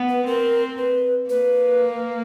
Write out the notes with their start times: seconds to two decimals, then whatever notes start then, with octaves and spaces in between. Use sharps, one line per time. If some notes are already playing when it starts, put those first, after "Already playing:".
Already playing: B3
0.09 B4
0.26 C4 A#4
0.78 B4
1.29 A#3 B4